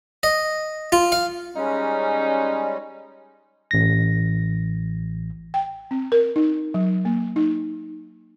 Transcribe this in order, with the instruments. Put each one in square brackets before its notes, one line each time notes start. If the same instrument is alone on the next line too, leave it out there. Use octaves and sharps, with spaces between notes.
[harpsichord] D#5
F4
F5
[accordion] G3 G#3 C#4 [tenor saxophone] D#4
[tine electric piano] A1 A#6
[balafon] G5
C4
A#4
D#4
F#3
A#3
D#4